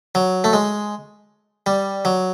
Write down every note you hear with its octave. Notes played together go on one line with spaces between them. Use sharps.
F#3
A3
G#3
G3
F#3